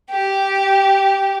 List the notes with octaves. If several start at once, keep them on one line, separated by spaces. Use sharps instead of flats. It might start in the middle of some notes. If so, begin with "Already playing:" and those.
G4